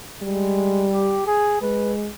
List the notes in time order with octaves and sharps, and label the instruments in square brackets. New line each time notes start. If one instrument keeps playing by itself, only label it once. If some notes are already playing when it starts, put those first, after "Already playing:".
[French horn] G3 [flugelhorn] G#3
[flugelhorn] G4
G#4
[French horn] G#3 [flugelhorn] B4